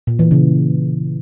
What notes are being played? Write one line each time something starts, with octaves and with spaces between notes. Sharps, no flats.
A#2
E3
C#3